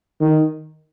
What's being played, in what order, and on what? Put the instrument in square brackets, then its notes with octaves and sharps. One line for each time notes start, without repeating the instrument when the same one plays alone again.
[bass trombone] D#3